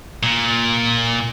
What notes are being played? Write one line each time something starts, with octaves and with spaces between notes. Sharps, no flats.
A#2